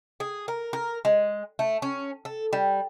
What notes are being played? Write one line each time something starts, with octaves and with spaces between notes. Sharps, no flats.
G#4
A#4
A#4
G#3
A3
C#4
A4
G3